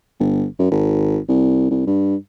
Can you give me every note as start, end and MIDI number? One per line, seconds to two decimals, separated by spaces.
0.20 0.45 31
0.59 0.68 42
0.71 1.18 32
1.28 1.69 36
1.70 1.85 36
1.87 2.15 43